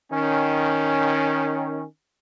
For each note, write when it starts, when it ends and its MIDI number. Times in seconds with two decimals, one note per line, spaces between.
0.12 1.83 51
0.12 1.83 61